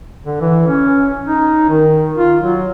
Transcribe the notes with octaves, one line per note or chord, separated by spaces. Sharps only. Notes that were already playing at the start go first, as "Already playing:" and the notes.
D3
E3
C#4
D#4
D#3
F4
F#3